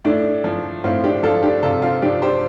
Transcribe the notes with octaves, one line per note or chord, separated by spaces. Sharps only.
A2 A3 D4
F3
A2 C4 F4
D4 G4
F3 F4 A4
D4 G4
C3 F4 A4
C4 F4
F3 D4 G4
G4 C5